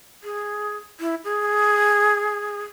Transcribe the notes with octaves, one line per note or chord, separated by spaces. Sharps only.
G#4
E4
G#4